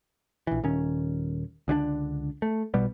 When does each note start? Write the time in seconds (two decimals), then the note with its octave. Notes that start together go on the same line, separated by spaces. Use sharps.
0.47 A#1 E3
0.64 D#1 D#3 C#4
1.68 C#2 D3 E3 D4
2.42 A3
2.74 B1 B2 G3 B3